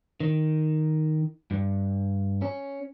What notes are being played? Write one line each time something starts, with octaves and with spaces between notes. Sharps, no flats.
D#3
G2
C#4